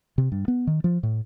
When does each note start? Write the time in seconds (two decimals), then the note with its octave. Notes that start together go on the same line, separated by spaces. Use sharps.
0.18 C3
0.32 G2
0.48 B3
0.67 D#3
0.84 F3
1.03 A2